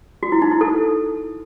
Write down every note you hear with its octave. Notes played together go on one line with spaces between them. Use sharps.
F#4
E4
D#4
E4
A4